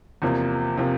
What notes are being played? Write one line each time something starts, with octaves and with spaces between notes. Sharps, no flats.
E2 C3 F3 A#3
C3 F3 A#3